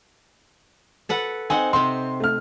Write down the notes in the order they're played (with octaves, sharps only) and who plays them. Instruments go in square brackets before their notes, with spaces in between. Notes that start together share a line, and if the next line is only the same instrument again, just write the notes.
[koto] A4 B4 F#5
[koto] C4 D#4 F#5 [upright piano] G#5
[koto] C3 C4 [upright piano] C6
[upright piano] A3 F6